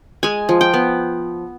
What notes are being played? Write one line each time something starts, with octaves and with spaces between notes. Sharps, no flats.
G#3 G#5
F3
G5
B3